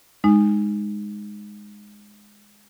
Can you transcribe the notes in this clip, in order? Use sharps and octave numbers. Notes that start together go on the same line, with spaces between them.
G#3 D#4